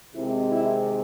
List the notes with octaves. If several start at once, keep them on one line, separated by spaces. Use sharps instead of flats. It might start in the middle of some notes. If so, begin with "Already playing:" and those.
C3 D#3 G#3 C4 E4
E4